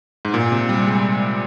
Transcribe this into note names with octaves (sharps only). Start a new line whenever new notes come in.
G#2
A#2
C3
G3
G#3